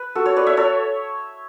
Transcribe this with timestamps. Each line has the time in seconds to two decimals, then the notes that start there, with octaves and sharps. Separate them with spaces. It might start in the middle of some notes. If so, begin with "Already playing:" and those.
Already playing: B4
0.15 F#4 A4
0.25 A4 C#5
0.36 B4 D5
0.47 C#5 E5
0.57 A4 C#5